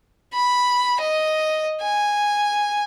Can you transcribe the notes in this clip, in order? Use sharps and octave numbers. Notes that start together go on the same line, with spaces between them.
B5
D#5
G#5